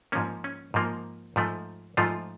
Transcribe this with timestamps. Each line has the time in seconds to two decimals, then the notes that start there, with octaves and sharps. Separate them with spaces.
0.12 G#2 F3 A#3 C#4
0.44 C#4
0.74 G#2 F3 A#3
1.36 G#2 F3 A3
1.97 G#2 F3 A3 F4